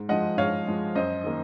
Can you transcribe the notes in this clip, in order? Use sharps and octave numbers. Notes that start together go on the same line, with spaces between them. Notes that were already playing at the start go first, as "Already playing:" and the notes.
Already playing: G#2
F3 G#3 D#5 F#5
G#2 C#5 F5
F3 G#3
F#2 C5 D#5
D#3 A#3